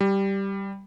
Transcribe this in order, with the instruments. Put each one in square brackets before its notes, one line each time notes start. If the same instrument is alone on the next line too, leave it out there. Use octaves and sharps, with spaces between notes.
[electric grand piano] G3